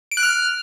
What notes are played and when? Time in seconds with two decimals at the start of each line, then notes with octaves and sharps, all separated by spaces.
0.11 D7
0.17 F#6
0.23 F6